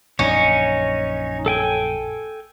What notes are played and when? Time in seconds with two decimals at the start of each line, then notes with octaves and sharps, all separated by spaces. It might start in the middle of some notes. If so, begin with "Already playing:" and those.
0.19 A#1 F#2 C#4 D#4 C#5
1.46 A4 G5 G#5